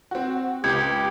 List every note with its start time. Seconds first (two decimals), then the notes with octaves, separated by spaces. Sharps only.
0.11 C4 F#4
0.64 C#2 G4 G#6